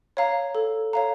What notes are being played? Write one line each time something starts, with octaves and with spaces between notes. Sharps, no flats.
C#5 F5 A#5
A4
C#5 F5 A#5